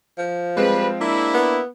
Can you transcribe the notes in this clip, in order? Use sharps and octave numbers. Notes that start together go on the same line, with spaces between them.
F3
G3 G#3 C4 B4
A#3 D4 E4
B3